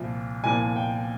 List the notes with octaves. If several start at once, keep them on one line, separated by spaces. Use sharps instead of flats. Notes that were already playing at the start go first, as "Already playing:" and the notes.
Already playing: C2 A#2 F3
C2 A#2 F3 G#5
G5